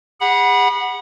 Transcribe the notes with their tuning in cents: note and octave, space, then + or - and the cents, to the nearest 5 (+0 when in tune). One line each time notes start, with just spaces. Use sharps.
G#4 -45 F#5 +0 B5 -25